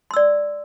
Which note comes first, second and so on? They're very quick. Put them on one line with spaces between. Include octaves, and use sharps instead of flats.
C6 E6 D5